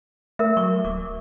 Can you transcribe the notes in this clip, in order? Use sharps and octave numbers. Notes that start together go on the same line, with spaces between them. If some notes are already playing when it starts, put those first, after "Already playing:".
A3 A#4 E5
F#3 C#6
D1 D6